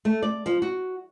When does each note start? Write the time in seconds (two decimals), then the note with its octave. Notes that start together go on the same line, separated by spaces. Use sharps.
0.05 A3
0.22 D5
0.46 F3
0.62 F#4